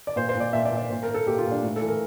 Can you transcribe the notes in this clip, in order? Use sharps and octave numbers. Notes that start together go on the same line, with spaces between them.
D5
A#2 C5
C5
A#2
D5
A#2 E5
D5
A#2
D5
A#2 C5
A#4
A#2
A4
A#2 G4
F4
A#2
D4
A2
A4
E3
A#4